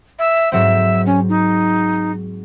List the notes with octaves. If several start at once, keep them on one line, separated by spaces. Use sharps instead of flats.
E5
G#2 F#3 C4 E5
C#4
D#4